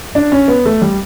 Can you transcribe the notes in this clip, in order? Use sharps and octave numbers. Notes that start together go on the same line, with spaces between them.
D4
C#4
B3
A3
G3